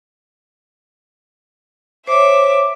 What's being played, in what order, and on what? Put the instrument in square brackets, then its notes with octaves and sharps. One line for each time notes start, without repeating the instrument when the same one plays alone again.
[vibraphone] C5 C#5 [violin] E5 D6